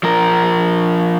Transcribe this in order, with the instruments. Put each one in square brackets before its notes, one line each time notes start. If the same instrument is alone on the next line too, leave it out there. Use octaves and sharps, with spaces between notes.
[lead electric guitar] F3 A#4